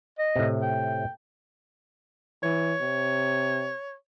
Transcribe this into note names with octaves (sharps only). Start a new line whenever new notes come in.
D#5
A2 C3
G5
E3 C#5
C3